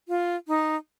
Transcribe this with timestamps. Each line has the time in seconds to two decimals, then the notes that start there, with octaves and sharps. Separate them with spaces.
0.08 F4
0.48 D#4